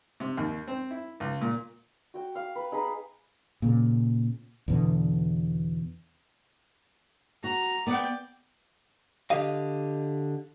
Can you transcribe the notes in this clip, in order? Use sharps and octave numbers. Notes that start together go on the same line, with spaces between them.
C3
D#2
C4
E4
C#2
A#2
F#4 G5
F5
B4
D#4 G#4 B4 B5
A#2 C#3
E2 B2 D3
F#4 A#5
B3 D5 G5
D3 G4 D#5 F5